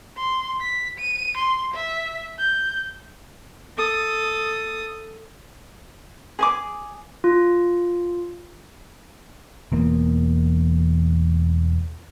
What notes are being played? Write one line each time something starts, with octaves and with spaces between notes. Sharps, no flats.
C6
B6
D#7
C6
E5
G6
A4 D#6
G#4 G#5 D6
F4
E1 E2 A#3